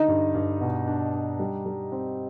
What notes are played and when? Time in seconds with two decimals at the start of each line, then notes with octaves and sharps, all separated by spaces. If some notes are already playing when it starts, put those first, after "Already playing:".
Already playing: D3 D#4
0.08 G2
0.35 G2
0.61 B2
0.87 D4
1.14 D4
1.40 G3
1.66 G3
1.92 C4